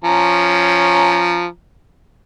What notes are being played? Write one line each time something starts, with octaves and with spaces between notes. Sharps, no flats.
F3 C#4 A#5